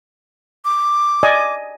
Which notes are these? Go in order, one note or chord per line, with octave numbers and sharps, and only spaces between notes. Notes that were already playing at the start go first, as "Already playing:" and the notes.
D6
D5 D#5 G#5